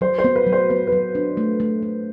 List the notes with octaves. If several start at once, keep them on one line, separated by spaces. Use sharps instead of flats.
F#3 C5
C5
B3
B4
F#3
C5
B3 B4
B4
F#3
D4
A3
A3
A3